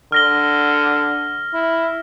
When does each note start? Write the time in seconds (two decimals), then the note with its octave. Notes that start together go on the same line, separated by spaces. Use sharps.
0.12 D3 F6 A#6 G7
1.54 E4